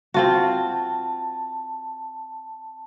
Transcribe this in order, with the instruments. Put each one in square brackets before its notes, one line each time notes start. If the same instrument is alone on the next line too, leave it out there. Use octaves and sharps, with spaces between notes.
[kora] C4 F4 F#4 [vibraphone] A5